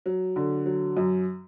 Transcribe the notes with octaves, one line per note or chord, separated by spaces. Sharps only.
F#3
D3
F#3
F#2